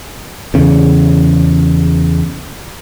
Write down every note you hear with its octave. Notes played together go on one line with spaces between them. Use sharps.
E2 C#3